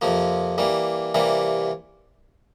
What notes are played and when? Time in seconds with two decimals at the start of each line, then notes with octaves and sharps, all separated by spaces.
0.01 F2 C3 F3 A#3
0.58 E3 G3 A#3
1.14 C3 E3 G3 A#3